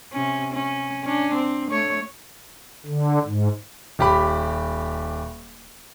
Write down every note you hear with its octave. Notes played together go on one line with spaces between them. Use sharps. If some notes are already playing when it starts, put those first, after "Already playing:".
C3 C#4
C#4
C#4 D4
C4
A3 C#5
D3
G#2
D#1 G4 B5